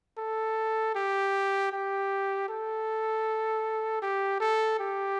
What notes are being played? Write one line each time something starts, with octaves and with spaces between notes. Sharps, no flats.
A4
G4
G4
A4
G4
A4
G4